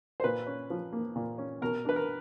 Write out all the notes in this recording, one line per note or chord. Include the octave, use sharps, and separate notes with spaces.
C5
A#2 B4
C#4
F3
A#3
A#2
C#4
B2 A#4
D4 B4
A#4